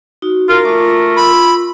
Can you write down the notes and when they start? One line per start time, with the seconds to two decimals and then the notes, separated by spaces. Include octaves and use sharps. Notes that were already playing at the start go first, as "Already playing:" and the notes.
0.22 D#4 F#4
0.49 F4 A#4
0.65 A3 F4 D6
1.16 F4 B5 C6 E6